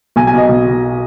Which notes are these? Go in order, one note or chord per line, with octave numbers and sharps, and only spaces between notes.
B1 G#5
G#5
B2 D#5
B1
B2